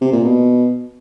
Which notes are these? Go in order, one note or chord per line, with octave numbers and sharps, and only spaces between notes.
C3
A#2
B2